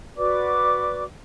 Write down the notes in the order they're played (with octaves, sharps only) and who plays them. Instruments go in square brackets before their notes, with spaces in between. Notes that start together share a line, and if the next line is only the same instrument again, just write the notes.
[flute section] F#4 B4 D5 D6